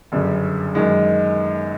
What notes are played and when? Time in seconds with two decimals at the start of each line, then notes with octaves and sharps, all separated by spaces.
0.12 G1 F#2 C#3
0.75 F#2 D#3 G#3